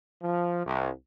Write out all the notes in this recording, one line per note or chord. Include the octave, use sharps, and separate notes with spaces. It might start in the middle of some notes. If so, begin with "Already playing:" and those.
F3
C2